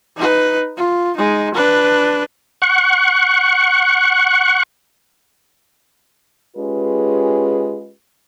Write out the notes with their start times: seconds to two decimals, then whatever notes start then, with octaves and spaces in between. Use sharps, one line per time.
0.17 D#4 B4
0.77 F4
1.17 G#3 D#4
1.54 D4 B4
2.62 F#5 C#6
6.57 G#3 C#4 F4 G4 G#4 B4